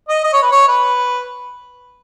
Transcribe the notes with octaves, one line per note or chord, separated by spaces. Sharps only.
D#5
D#5
C#5
B4
C#5
B4